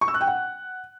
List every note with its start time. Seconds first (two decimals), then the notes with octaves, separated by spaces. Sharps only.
0.01 C#6
0.08 E6
0.14 F#6
0.21 G5
0.27 F#5